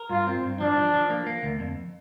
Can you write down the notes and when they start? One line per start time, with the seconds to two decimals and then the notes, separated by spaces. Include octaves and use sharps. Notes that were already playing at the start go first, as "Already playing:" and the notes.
Already playing: A#4
0.10 G2 F4
0.27 C4
0.43 G2
0.60 F3 D4
0.77 F3
0.94 F3
1.10 A#3
1.27 A#3
1.43 D2
1.60 F2